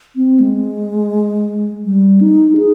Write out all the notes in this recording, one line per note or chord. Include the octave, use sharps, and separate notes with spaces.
C4
G#3
G3
D#4
G#4